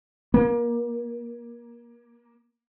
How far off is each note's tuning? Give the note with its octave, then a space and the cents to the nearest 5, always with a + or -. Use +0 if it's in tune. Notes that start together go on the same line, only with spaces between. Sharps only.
A#3 +25